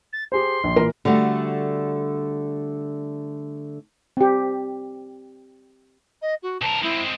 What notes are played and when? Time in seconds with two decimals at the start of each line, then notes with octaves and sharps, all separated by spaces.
0.13 A6
0.32 G4 G#4 C5 C6
0.64 A#1
0.76 A#2 E3 A#4
1.05 D3 G3 A3 F#4
4.17 C4 G4
6.22 D#5
6.43 F#4
6.62 B1 A#4 A5
6.83 G#3 C4 E4